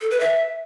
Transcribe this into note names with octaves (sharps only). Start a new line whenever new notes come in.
A4
B4
E5